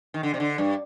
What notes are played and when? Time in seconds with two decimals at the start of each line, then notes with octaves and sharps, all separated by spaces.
0.14 D#3
0.23 D3
0.34 C3
0.40 D3
0.58 G2